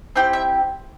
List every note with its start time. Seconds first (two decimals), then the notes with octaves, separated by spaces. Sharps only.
0.16 C4 E4 G4 G5
0.33 E5